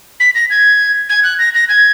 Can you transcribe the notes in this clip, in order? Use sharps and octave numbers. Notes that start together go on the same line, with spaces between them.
B6
A#6
G#6
G#6
F#6
A#6
A#6
G#6